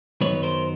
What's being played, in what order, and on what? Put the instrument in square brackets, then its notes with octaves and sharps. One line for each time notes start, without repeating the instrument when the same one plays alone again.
[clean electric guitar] F#2 D#3 F#3 B3 D#4 B4 C#5
A#4 C5